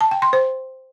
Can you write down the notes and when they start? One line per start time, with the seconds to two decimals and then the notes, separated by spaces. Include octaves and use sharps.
0.01 A5
0.11 G5
0.22 C6
0.33 C5